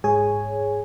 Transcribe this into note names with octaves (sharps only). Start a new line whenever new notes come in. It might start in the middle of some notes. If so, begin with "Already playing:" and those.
G#2 G#4 C#5 G#5